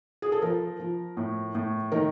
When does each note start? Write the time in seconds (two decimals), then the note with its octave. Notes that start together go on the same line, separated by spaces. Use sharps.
0.22 G#4
0.32 A4
0.42 F3 A#4
0.80 F3
1.17 A2
1.55 A2
1.92 D#3 A#4